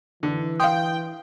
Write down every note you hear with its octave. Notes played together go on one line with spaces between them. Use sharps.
D3 E3
F5 G5 C6 D#6